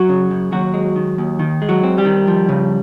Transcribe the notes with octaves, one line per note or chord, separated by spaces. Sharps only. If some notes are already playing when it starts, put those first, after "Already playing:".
Already playing: F#2 F#3 F#4
C#3
F#2
D#2 F#3 F#4
G#3
D#3
D#2
D#3
G#3
F#3 F#4
C4
G3 G4
D#3
F3
C#3